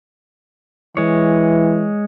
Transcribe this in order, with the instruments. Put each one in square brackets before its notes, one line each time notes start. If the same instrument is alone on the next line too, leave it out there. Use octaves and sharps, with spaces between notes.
[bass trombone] E3 [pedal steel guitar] G#3 C#5